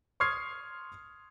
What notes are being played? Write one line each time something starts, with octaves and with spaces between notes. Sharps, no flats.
C6 C#6 D#6 F6 G#6 C7